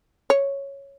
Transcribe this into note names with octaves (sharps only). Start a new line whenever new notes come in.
C#5